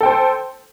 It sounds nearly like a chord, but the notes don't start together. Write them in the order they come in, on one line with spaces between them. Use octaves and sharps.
A4 G5 C5